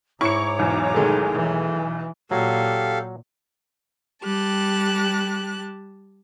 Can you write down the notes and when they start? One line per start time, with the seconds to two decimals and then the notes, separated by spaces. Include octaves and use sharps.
0.21 G#2 E4 C#5 A#5 C#6 D6 C#7
0.59 B1 E2
0.94 D#3 G#3 A3
1.33 E3
2.31 A#2 F#3 G4 A4 F5
4.23 G3 G4 A5 F#6